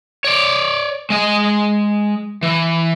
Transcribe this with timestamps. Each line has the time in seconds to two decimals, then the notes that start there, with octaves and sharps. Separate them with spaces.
0.24 C#5 D5
1.10 G#3 D#5
2.43 E3